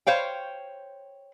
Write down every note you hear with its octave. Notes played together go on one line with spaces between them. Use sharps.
C5 C#5 F5 G5